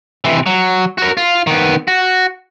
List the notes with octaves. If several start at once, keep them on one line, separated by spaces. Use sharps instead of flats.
C3 E3
F#3
F#4 A#4
F4
D#3 B3
F#4